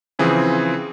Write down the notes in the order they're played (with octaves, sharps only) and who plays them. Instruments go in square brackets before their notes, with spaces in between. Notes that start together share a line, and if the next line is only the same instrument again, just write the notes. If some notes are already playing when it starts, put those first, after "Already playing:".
[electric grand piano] C#3 E3 F3 C4 G#4